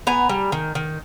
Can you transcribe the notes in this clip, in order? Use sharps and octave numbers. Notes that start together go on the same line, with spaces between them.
B3 G#5 A#5
G3
D#3
D#3